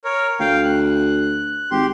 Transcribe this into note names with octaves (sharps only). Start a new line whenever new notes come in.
A#4 C#5
D2 F5 G5
F#6
G#1 G4 C6